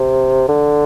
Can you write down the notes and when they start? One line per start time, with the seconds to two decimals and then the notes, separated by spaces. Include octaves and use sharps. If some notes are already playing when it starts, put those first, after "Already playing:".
Already playing: C3
0.48 D3